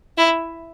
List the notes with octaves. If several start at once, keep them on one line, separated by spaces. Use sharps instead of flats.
E4